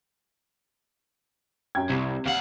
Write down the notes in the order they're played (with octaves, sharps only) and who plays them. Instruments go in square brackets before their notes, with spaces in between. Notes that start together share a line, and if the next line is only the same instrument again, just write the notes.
[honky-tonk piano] F#2 G5 G#6
[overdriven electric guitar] C2 [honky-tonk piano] C3
[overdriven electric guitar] D#2 F#5 [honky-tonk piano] F5